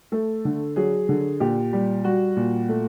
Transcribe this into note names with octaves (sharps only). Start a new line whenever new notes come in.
A3 A4
D3
F#3 G#4
D3
A#2 G4
G3
G3 F#4
A#2
A3